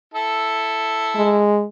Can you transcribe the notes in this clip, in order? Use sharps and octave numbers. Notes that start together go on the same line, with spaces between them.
E4 A4
G#3